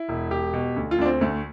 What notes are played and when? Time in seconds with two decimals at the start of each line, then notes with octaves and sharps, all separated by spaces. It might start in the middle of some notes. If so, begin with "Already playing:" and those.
Already playing: E4
0.08 E1
0.31 E1 G4
0.54 B2
0.76 D2
0.91 F4
0.98 D2 D4
1.05 C4
1.21 D2 A3